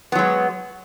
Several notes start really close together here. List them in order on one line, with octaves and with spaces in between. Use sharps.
B3 F#3 G#3